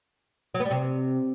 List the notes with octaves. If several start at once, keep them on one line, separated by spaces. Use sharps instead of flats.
F#3
B3
G3
C3